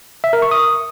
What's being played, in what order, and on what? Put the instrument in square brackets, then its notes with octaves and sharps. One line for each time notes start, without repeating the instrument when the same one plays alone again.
[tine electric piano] E5
A#4
C#6
D#6